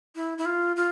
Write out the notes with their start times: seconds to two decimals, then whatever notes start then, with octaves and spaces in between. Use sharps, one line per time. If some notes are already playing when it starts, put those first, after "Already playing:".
0.16 E4
0.38 E4
0.45 F4
0.76 F4